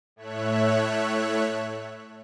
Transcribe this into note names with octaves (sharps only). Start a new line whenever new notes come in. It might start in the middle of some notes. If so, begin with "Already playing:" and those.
A2 A3 C#5 E5 F#6